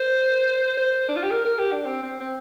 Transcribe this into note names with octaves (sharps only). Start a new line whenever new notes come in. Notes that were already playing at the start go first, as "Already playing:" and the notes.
Already playing: C5
C5
D4
F4
G4
A#4
A#4
G4
D4
C4
C4
C4